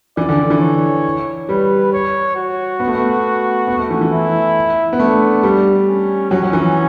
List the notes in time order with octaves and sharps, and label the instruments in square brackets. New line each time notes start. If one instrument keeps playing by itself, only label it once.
[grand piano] E3 [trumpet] D5
[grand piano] D3
D3
E3
[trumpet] C#5
[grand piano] G3 [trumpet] B4
[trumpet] C#5
F#4
[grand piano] B3
A3
B3
B3
A3
E3
E3
[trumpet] E4
[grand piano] B3
[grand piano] A3 [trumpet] D4
[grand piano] G3
[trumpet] C#4
[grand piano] F#3 [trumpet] C#4
[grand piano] F#3
E3